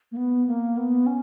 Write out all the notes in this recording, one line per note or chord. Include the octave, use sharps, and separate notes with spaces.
A#3
B3
A#3
B3
C#4